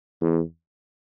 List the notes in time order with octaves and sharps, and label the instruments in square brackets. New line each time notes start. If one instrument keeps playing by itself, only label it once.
[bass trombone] E2